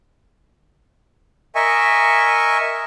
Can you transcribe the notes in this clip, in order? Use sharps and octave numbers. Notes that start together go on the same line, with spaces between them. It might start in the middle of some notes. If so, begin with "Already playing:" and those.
A#4 D#5 E5 G#5 C#6